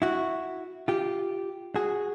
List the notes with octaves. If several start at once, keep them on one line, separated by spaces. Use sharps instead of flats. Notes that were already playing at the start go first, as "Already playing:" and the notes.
E4 F#4
F4 G4
F#4 G#4